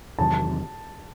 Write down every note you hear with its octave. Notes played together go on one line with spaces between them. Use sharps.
E2 C3 D#3 F#3 A5